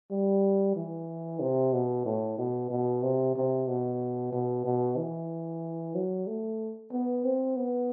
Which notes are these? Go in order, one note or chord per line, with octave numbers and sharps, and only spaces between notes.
G3
E3
C3
B2
A2
B2
B2
C3
C3
B2
B2
B2
E3
F#3
A3
B3
C4
B3